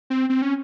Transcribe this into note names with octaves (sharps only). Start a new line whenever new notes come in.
C4
C4
C#4